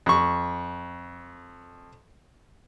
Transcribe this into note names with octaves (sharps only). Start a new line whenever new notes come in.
F2 C#6